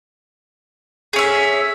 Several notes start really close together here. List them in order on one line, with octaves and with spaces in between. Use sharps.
G#4 C#4 E5